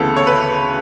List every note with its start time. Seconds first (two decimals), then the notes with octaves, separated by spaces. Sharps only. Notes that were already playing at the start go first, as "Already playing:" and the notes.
Already playing: D2 C#3 E3 B3 A4
0.16 C#5
0.27 B4